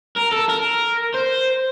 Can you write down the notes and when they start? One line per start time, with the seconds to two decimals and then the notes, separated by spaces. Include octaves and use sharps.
0.18 A#4
0.33 A4
0.50 A#4
1.15 C5